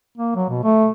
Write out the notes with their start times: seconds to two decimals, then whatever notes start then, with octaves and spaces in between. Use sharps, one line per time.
0.17 A#3
0.35 F#3
0.49 B2
0.64 A3